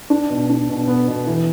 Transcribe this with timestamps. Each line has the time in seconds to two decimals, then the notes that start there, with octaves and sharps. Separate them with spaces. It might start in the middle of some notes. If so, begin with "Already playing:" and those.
0.10 D4
0.30 B2
0.50 D4
0.69 B2
0.88 B3
1.08 B2
1.27 E3